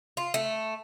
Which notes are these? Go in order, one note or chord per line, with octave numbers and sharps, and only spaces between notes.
F4
A3